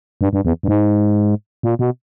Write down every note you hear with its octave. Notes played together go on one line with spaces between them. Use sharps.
G2
G2
E2
G2
G#2
A#2
B2